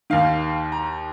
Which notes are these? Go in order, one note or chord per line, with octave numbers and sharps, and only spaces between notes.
D#2 D#3 F5
A#5